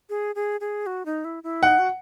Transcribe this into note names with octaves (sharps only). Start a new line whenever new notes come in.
G#4
G#4
G#4
F#4
D#4
E4
E4
D#4 F#5
F#4